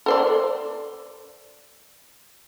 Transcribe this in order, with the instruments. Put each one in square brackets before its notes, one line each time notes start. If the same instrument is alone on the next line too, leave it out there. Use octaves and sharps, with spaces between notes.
[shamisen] A4 C5 D5